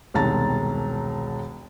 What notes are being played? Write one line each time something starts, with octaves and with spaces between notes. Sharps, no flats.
E1 C2 D#3 A5 A#5 A6